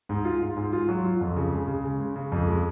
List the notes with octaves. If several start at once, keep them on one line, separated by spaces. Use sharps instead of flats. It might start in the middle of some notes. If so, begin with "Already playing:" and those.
G#2
F4
G#2
G#2
F4
F#3
F4
F2
C#3
G#3
C#3
C#3
G#3
C#3
F2
G#3